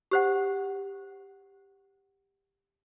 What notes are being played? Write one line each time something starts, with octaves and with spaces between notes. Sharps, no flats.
G4 C5 F#5